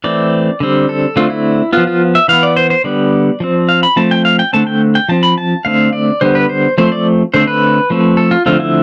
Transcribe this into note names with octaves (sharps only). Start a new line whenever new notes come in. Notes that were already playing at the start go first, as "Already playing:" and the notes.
E3 A3 C4 D5
D3 G3 C4
A4
D3 A3 C4 F4
E4
F3 B3 F4
F4
E5
E3 B3 F5
D5
C5
C5
D3 G3 B3 D5
F3 C4
F5
B5
F3 A3 C4 A5
G5
F5
G5
D3 A3 C4 A5
G5
G5
F3 C4 A5
B5
A5
D3 A3 C4 F5
D5
D3 G3 B3 C5
B4
C5
F3 A3 C4 C5
D5
D3 A3 C4 C5
B4
F3 A3 C4
A4
F4
D3 F3 A3 C4 F4
E4